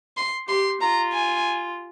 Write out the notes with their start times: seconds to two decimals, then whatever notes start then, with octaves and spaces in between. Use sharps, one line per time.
0.17 C6
0.48 G4 C6
0.81 F4 A#5
1.13 G#5